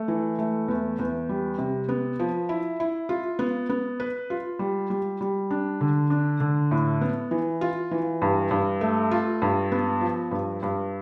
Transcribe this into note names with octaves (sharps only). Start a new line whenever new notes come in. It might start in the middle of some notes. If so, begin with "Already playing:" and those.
Already playing: A3
E3
A3
E2
E2
G3
C3
B3
F3
E4
E4
F4
B3
B3
B4
F4
G3
G3
G3
D4
D3
D4
D3
A2
B3
E3
F4
E3
G2
G2
A3
F4
G2
B3
F3
G2
G2